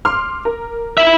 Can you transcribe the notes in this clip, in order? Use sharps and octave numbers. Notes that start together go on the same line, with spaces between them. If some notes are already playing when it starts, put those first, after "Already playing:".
C6 D6 F6
A#4
E4 E5